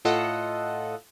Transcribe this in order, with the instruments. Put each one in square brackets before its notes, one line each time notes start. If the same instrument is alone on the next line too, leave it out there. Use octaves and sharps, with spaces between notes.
[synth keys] A2 F4 A4 D#5 F#5